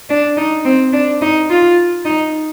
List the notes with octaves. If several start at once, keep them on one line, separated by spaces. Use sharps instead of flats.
D4
D#4
C4
D4
D#4
F4
D#4